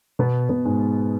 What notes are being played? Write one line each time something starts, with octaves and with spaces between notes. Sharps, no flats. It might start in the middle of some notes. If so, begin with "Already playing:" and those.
B2 B3
B2 B3
G#2 G#3